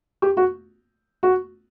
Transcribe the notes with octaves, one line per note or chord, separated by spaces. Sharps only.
G4
F#4
F#4